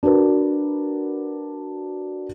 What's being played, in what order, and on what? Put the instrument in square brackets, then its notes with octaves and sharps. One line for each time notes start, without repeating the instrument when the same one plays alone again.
[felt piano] D4 F#4 A#4 B4